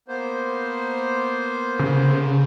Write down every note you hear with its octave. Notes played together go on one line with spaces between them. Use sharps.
A#3 B3 C5
C#3